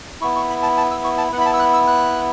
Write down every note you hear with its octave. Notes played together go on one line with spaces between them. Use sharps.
B3 E4 C#6
C#6
B5
A5
A5
E6
C#6
A5
B3 F#5
E4 B5
A5
E6
F#6
E6
F#6